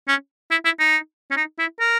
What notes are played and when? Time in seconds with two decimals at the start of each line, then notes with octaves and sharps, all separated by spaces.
0.08 C#4
0.51 E4
0.65 E4
0.80 D#4
1.31 C#4
1.37 D#4
1.59 E4
1.80 A#4